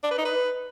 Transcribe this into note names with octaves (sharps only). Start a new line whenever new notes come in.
D4
B4
D#4
B4